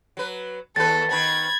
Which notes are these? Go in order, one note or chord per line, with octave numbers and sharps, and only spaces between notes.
F#3 B4
D#2 B3 A4 B4 A6
D#3 B3 B5 G#6